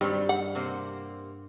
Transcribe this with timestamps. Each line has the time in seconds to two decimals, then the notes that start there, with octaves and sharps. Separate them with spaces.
0.01 G2 D#3 F#3 G3 C4
0.29 F#5
0.55 C3 A#3 C5